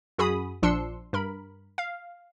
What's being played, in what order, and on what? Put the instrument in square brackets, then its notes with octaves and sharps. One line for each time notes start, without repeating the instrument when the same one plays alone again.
[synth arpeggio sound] F#2 F#4 G#4 B5 D#6
A#1 F3 D4 C6 E6 C#7
G2 A#4 B5
F5